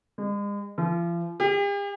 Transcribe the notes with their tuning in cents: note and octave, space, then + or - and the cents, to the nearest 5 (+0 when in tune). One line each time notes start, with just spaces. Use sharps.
G#3 -40
F3 -40
G4 +45